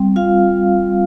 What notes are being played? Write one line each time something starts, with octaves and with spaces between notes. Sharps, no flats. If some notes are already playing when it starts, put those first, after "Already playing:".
Already playing: G3 C4
F4 F5